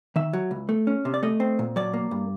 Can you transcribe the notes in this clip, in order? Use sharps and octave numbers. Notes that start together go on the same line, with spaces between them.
D#3 E5
F#3
C#2
A3
C#4
C3
D5
A3 D#5
C4
A#2
F#3 D5
A#3
G2